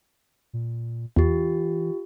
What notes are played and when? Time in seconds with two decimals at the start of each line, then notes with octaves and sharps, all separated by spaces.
0.53 A#2
1.16 E2 E3 F4 G4